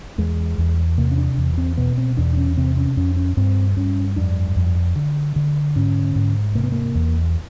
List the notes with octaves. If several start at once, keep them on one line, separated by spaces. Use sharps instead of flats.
E2 G#3
E2
C3 A#3
C#4
D4
E2
C4
B2 B3
C4
E2 D4
C#4
C3 C4
C#4
F2 C#4
C#4
G2 C4
G2 C#4
F2 D4
F2
D3
D3
G#2 C#4
G#2
C3 A#3
B3
A#3
E2